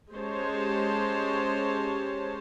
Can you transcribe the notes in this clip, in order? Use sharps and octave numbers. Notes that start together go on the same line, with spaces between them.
G#3 C#4 G4 C5 C#5 A5